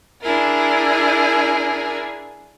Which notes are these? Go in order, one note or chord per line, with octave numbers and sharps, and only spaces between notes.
D4 E4 G#4 A#4